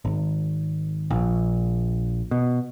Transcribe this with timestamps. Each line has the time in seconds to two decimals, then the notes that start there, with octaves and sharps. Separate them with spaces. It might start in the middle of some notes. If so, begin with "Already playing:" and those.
0.05 G#1
1.11 A#1
2.31 B2